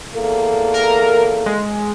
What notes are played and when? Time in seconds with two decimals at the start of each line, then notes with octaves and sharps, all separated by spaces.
0.15 E2 A#3 A4
0.74 A#4
1.46 G#3